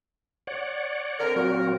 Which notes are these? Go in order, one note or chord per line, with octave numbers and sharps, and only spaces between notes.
C#5 D5 F#5
D3 C4 A#4
A#2 F#3 C4 F#4 A#4